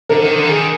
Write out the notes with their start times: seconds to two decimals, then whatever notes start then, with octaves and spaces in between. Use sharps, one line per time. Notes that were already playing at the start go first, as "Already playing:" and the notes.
0.09 D3 A#4
0.22 D#3
0.36 D3
0.44 E3
0.49 D#3 G#4